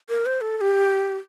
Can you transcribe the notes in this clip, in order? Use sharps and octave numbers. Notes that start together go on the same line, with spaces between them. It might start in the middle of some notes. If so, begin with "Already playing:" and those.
A#4
C5
A4
A4
G4